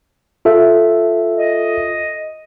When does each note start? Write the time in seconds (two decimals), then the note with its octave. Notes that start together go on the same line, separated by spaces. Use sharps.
0.45 F4 A4 E5
1.37 D#5